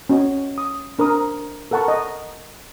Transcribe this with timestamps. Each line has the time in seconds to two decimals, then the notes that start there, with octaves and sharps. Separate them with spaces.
0.09 C#4 F#4 C#5 D#5
0.58 D#6
0.99 D4 A#4 C5 D#6
1.71 A4 A#4 F#5 A5 C#6
1.88 D#5